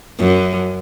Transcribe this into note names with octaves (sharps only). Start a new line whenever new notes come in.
F#2